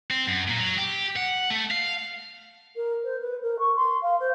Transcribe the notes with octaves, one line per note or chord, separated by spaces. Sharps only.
C4
F#2
A#2
F#3
G4
F#5
A3
F5
A#4
C5
B4
A#4
C#6
C6
F5
C5